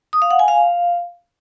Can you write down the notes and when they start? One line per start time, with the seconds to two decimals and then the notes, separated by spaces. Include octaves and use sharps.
0.13 D#6
0.22 F5
0.31 F#5
0.39 G#5
0.48 F5